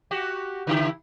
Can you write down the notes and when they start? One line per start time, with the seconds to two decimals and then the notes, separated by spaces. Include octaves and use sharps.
0.11 F#4 G4
0.67 C#3 E4 G4